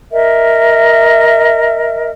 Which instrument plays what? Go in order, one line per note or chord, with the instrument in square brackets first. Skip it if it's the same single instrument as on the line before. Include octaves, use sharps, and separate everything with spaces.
[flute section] A#4 D#5 E5